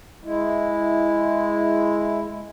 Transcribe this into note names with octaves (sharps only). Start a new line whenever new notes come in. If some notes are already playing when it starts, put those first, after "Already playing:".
G#3 E4